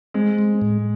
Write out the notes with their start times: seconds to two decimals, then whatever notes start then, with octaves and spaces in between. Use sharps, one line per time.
0.14 G#3 C4
0.39 G#3
0.62 A2